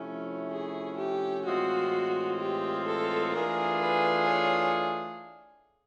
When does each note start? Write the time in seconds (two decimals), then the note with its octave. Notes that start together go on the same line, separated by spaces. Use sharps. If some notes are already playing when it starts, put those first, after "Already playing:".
Already playing: C3 F3 A3 C#4 E4
0.51 G#4
0.97 G4
1.45 A2 E3 G#3 C4 F4 F#4
2.39 G4
2.87 A4
3.33 E3 A3 D4 F4 G#4 A#4
3.82 B4
4.29 C#5